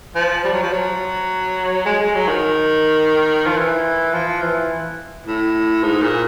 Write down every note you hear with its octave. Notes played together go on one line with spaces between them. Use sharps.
F3
G3
F#3
F3
F#3
G#3
G#3
F#3
D#3
F3
E3
F3
E3
A2
G#2
A#2